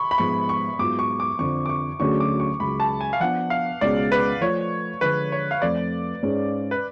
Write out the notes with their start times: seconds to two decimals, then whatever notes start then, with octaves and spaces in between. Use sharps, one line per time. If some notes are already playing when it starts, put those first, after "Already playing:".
Already playing: B5 C#6
0.11 B5
0.18 G#2 F3 G#3 B3 C#6
0.49 C#6
0.79 G#2 F#3 B3 F4 D6
0.99 C#6
1.20 D6
1.39 F2 D3 F3 C#6
1.66 D6
1.69 C#6
2.00 D2 D3 F#3 C#4 G#4 C#6
2.20 D6
2.40 C#6
2.60 C#2 C#3 F#3 B5
2.80 A5
3.01 G#5
3.13 F5
3.20 F3 B3 D4 F#5
3.50 F5
3.81 C#2 B2 G#3 C#4 G#4 D5
4.12 B4
4.41 F3 A3 F4 C#5
5.01 D3 F3 G#3 B4
5.32 C#5
5.51 F5
5.62 F2 F3 A3 D5
6.23 G#2 G#3 C#4
6.71 B4